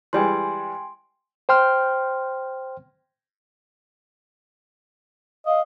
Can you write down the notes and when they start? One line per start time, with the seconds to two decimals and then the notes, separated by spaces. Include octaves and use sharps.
0.13 E3 G3 G#3 G5 G#5 C6
1.49 C5 G5 C6 F6
5.46 D#5 F5